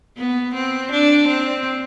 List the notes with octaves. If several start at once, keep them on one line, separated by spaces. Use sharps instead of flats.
B3
C4
D4
C4